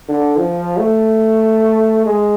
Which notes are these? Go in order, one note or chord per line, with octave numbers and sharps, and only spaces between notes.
D3
F3
A3
G#3